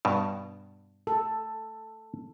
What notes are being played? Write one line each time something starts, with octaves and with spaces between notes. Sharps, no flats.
G2 B2
A4